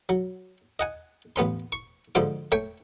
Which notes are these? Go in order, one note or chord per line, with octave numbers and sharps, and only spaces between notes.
F#3
D#5 F#5 G#5
A1 B3 C#4 C6
C#6
F2 G#2 D3 F3 D6
A3 C#5 G5